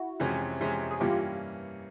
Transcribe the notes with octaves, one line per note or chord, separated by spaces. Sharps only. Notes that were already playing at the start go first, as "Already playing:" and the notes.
Already playing: E4 F#4
F2 C3 E3 G#3 C#4
F2 C3 E3 G#3 C#4
G#4
G2 E3 G3 A#3 C#4 F4 G4